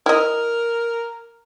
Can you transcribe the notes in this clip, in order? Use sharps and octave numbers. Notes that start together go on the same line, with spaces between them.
E4 A#4 D#5